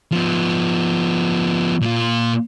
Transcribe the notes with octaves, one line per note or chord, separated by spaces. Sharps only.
F3 B3
A#2 F4